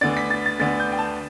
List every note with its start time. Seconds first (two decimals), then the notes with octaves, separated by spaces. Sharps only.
0.01 D2 D3 B3 D4 A6
0.17 B6
0.30 A6
0.46 A6
0.59 D2 D3 B3 D4 A6
0.80 G6
0.92 G5
0.99 A5